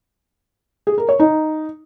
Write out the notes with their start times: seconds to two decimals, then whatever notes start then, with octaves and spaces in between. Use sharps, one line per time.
0.87 G#4
0.98 A#4
1.09 C#5
1.19 D#4